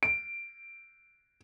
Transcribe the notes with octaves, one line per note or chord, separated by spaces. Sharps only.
D7